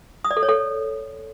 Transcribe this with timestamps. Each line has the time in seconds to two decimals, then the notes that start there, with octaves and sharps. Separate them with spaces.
0.25 D#6
0.31 D5
0.37 A4
0.43 C#5
0.49 A4